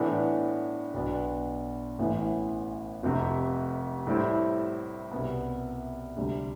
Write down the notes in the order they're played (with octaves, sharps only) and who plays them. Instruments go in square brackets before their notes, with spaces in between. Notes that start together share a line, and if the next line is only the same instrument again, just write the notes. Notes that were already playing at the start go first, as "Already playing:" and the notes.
Already playing: [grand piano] A2 E3 B3 D4
B1 B2 B3 D4
A1 A2 E3 B3
F1 F2 C3
A2 G3 C4 E4
C2 B2 B3
D2 C3 G3